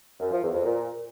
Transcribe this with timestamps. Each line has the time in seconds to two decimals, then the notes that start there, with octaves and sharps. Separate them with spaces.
0.20 F#2
0.31 F3
0.43 E2
0.54 F2
0.65 A#2